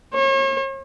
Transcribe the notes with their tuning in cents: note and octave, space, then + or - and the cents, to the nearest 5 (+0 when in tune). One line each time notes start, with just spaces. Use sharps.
C#5 -40